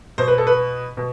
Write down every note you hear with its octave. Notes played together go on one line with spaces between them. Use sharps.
B2 C5
B4
A4
B4
B2